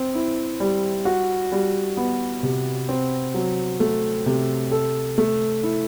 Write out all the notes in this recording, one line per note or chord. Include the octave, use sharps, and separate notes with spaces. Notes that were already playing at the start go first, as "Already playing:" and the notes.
Already playing: C4
E4
G3
F#4
G3
B3
C3
C4
F#3
A3
C3
A4
A3
E4